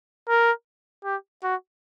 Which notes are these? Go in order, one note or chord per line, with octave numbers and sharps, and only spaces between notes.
A#4
G4
F#4